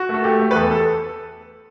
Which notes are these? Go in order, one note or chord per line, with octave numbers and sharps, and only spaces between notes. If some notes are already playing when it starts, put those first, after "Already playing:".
Already playing: F#4
A3 A4
A3 G4
A3
B4
E2 A4
A4